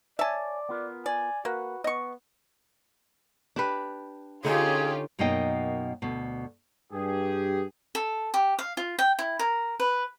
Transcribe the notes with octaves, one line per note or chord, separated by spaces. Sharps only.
C#5 D5 E5 G#5 A5
B3 F4 A#4
D5 G#5
A#3 F#4 B4
B3 D#5 C#6
D4 G4 B4
D3 C#4 D#4 F4 G4 G#4
F#2 B2 A#3 D#4 D#5 G5
D2 B2
G2 G4 G#4
A4
G4
F5
F4
G5
E4
A#4
B4